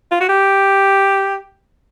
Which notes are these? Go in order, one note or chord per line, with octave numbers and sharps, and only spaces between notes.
F4
F#4
G4